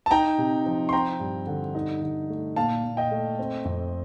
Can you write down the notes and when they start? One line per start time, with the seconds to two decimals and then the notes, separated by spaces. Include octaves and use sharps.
0.06 A5
0.11 D#4 G5 A#5
0.38 C3
0.66 F3
0.89 C6
0.92 C4 G5 A#5
1.20 G2
1.47 D3
1.75 D#4
2.02 D3
2.29 A3
2.56 A#2 F5 A5
2.84 A#2
2.97 D#5 G5
3.11 A3
3.39 C4
3.65 F2